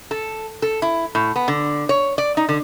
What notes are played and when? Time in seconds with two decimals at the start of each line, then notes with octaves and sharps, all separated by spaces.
0.11 A4
0.62 A4
0.82 E4
1.15 A2
1.36 B3
1.48 D3
1.89 C#5
2.18 D5
2.37 D#4
2.49 D3